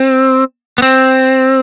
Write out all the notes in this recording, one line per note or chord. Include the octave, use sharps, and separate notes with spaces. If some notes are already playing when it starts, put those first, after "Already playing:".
Already playing: C4
B3
C4